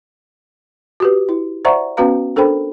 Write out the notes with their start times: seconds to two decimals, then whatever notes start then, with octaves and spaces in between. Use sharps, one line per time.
1.00 F#4 G4 B4
1.29 E4
1.65 C5 D5 E5 F#5 A#5 C#6
1.97 B3 C#4 F#4 B4 F5 A#5
2.36 D4 A4 A#4 C5 G5 B5